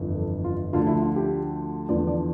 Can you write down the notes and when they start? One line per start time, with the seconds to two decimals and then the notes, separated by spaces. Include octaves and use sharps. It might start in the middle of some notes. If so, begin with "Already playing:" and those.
Already playing: G1 F2 E3
0.15 A4
0.44 F4
0.73 D2 D3 F3 F4
0.87 E4
1.02 F4
1.16 G4
1.89 E2 D3 F3 D5
2.07 D5